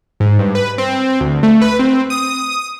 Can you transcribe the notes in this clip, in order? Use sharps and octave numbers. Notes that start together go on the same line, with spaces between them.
G#2
G2
B4
C4
D2
A3
B4
C4
D#6